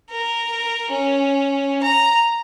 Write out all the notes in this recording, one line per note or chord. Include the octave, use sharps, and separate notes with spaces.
A#4
C#4
A#5